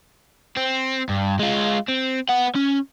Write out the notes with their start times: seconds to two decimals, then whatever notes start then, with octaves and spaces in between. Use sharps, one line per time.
0.57 C4
1.09 G2
1.39 G#3 F4
1.88 C4
2.29 B3 F#5
2.55 C#4